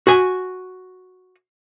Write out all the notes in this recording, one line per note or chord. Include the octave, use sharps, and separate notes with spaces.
F#4 G#5